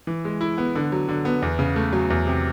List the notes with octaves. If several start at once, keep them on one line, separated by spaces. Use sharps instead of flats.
E3
G#3
E4
B3
D3
F#3
D3
B3
E2
C#3
A3
F#3
E2
C3